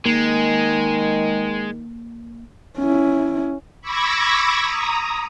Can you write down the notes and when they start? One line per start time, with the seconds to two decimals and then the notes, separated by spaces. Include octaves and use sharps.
0.06 D#3 G#3 A#3
2.78 C#4 E4
3.82 B5 C#6 D6 E6 G#6 A#6
4.62 A#5 D#6